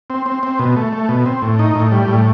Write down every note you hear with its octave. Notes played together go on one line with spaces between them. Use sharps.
C4
C4
C4
B2
A3
A3
B2
C4
A2
D#4
A2
G3
A2